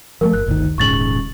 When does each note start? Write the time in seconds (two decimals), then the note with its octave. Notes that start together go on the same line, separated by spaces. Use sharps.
0.21 F3 G#3 A3 A#4
0.33 G1 F#6
0.46 G1 D2 D#3
0.78 D#1 G#2 C#3 C#6 A6 F#7